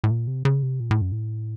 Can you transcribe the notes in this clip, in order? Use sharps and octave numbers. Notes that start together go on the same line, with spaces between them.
A2
A#2
C3
C#3
C3
A#2
A2
F#2
A2